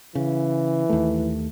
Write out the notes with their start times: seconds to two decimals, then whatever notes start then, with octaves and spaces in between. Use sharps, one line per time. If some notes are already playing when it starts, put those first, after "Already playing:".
0.15 C#3 E3
0.90 D#2 A3